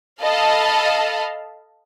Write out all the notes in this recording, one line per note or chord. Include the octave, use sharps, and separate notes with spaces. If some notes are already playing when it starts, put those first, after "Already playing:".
A4 D#5 F5 A5 B5